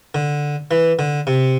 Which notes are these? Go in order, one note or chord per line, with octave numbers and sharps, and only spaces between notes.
D3
E3
D3
C3